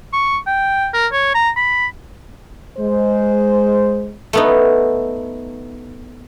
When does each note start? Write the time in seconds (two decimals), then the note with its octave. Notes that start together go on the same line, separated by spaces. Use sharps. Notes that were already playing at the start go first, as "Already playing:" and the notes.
0.13 C#6
0.47 G5
0.94 A#4
1.12 C#5
1.34 A#5
1.56 B5
2.79 G#3 C5
4.33 A3 B3 D#4